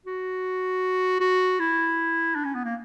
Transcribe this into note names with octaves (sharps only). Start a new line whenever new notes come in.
F#4
F#4
E4
D4
C#4
B3
A#3